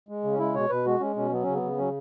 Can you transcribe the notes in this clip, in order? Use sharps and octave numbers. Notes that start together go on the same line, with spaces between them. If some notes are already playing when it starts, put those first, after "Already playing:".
G#3
C#3
C#4
G#3 E4
B2 C#5
B2 B4
G#3 F#4
G#3 C#4
B2 C#4
F#3 B3
C#3 C#4
B3
C#3
F#3 C#4